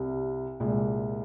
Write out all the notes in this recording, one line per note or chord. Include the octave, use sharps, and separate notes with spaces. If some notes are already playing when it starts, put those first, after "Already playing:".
Already playing: C2 C3 G3
C2 A#2 G#3